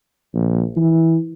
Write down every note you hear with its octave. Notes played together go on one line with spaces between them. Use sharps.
A#1
E3